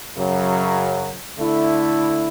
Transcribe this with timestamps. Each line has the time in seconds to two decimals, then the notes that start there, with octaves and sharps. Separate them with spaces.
0.17 F#2 C#3 F#3
1.39 D3 A3 E4